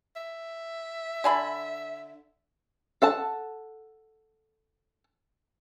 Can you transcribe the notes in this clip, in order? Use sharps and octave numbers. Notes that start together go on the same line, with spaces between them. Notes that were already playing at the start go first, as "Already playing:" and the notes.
E5
D3 G#5 B5
A4 F#5 A5